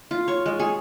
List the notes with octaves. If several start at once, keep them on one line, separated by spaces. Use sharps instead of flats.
F4
C#5
G#3
G#4